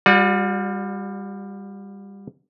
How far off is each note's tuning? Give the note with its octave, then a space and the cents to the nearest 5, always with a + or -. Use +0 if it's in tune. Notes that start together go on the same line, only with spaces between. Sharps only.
G3 +20 F#4 -40 D5 +0